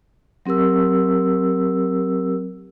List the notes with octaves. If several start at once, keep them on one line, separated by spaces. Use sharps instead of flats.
F#3 C4 G4 A#4 E6